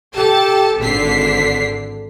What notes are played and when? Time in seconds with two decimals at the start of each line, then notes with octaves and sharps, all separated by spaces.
0.15 G4 A4 A5
0.79 G#1 D3 B6 C7